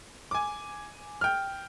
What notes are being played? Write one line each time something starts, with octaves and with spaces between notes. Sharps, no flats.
G#5 D6
G5 F6